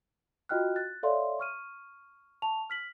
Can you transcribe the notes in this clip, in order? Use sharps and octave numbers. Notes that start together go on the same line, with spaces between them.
F4 F#4 D#5 G5 F6 F#6
F#6 A6
A4 C#5 D5 E5 F5 C6
C#6 F6 D#7
A5 C#6 F7
F6 B6 F#7